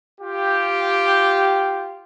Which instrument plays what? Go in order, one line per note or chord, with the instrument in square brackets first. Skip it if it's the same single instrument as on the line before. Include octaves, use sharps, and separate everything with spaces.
[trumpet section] F4 G4